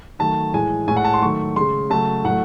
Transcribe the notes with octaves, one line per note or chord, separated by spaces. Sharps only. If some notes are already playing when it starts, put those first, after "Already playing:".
D#3 F#3 A3 A5
A2 E3 G#3 G#5
A2 G#3 G#5
F#5
A5
C6
D#3 F#3 A3 C#6
C#3 G#3 C6
C#3 F#3 A3 A5
A2 F#3 A3 F#5